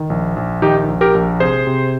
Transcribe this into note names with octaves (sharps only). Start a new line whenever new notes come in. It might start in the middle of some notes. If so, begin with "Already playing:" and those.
Already playing: D#3
A#1
A#1
D#3 D#4 G4
A#1
G4 A#4
A#1
C3 G#4 C5
C3